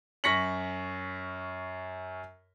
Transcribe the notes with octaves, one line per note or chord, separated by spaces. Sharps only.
F#2 C#6 A#6 B6 C#7 F#7